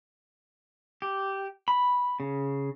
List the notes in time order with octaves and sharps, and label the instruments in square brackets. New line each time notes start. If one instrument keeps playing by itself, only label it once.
[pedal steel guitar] G4
B5
C#3